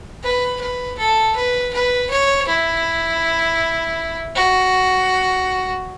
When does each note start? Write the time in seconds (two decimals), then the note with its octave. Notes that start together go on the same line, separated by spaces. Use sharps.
0.23 B4
0.61 B4
0.99 A4
1.36 B4
1.73 B4
2.10 C#5
2.48 E4
4.36 F#4